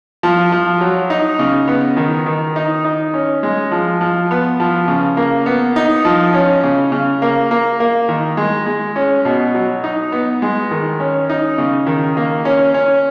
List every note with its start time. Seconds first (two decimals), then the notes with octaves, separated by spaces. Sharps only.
0.23 F3
0.52 F3
0.81 F#3
1.10 D#4
1.39 C#3
1.68 B3
1.97 D#3
2.26 D#3
2.56 D#4
2.84 D#4
3.14 C#4
3.43 G#3
3.71 F3
4.01 F3
4.31 B3
4.60 F3
4.88 C#3
5.17 A#3
5.46 B3
5.76 D#4
6.05 F3
6.34 C#4
6.64 C#3
6.92 C#3
7.22 A#3
7.51 A#3
7.80 A#3
8.09 D#3
8.37 G#3
8.66 G#3
8.96 C#4
9.25 B2
9.54 F#3
9.84 D#4
10.12 B3
10.42 G#3
10.71 D#3
11.00 C#4
11.30 D#4
11.58 C#3
11.87 D#3
12.17 A#3
12.45 C#4
12.74 C#4